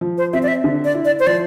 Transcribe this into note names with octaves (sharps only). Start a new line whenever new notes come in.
F3
C5
C4 E5
D5
E5
D3
D5
E4
D5
C5
F3 D5